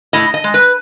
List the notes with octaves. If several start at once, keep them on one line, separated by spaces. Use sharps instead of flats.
A2 D#5
D#5
G#3
B4